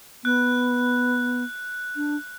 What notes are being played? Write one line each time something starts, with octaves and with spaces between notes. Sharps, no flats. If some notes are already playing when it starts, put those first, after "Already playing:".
B3 F#6
D4